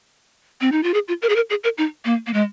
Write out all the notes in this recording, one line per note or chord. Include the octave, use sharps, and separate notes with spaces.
C4
D#4
F4
G#4
F4
A#4
G#4
A#4
G#4
A#4
D#4
A#3
A#3
G#3